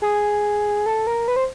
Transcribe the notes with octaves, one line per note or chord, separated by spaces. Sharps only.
G#4
A4
A#4
B4
C5